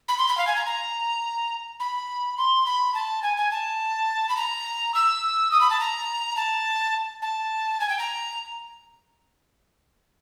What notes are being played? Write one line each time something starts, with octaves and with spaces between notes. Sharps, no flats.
B5
C6
B5
F5
G#5
A#5
A#5
B5
C6
B5
A5
G#5
G#5
A5
B5
A#5
E6
D#6
B5
A5
A#5
A5
A5
G#5
G5
A#5